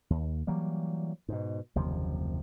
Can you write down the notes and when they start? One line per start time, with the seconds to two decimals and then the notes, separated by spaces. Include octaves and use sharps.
0.10 D#2
0.47 E3 F#3 G3 A#3
1.29 G#2 B2
1.75 F#1 D#2 C3 F3